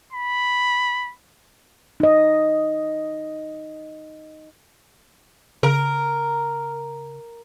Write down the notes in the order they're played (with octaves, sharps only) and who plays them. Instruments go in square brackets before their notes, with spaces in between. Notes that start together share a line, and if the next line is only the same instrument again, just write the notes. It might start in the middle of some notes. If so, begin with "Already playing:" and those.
[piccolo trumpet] B5
[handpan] D#4 D#5
[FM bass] C#3 [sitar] A#4